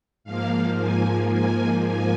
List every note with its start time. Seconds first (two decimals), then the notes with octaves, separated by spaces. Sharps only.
0.24 G#2 F3 A#3 F5
0.78 G#5
1.32 G#5
1.86 G#5